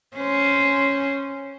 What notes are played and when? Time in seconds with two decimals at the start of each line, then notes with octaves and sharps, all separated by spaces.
0.17 C#4 C5